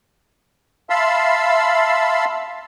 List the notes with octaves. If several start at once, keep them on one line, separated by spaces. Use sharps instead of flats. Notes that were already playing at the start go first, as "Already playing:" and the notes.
E5 F5 A5 B5 C6 E6